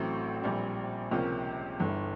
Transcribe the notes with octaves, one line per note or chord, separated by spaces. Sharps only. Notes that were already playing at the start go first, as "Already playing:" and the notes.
Already playing: A1 A2 F#3 A3 C4
A#1 A#2 G3 C4
C#2 C3 F3 A#3 C#4
G1 G2 E3